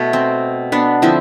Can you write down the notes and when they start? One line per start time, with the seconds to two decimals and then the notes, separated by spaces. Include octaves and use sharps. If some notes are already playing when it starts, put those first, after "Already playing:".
Already playing: B2 A3
0.13 C4
0.72 B3 D4
1.02 D3 F3 C4 E4